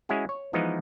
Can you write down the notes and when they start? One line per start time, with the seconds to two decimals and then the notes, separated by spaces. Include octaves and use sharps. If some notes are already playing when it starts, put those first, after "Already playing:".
0.09 G#3 C#4 E4 F#4 G#4
0.29 C#5
0.53 E3 F3 G#3 B3 D#4